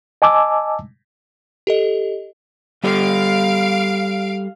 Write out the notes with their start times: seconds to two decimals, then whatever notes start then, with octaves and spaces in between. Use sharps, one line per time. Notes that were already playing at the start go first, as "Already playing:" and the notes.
0.22 D#5 G#5 A5 D6 E6
1.67 G4 A4 D#5
2.84 G3 G4 A4 F5 D7